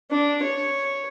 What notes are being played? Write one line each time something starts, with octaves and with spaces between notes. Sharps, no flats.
D4
C#5